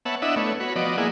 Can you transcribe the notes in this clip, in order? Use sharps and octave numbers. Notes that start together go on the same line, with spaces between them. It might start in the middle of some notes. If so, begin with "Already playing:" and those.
B3 C#5 E5 F#5 A5
D4 E4 D#5 E5 F#5
A3 B3 C#5
F#4 B4 C#5
F3 B3 F#4 D5 D#5
A#3 E4 G#4 D#5 F#5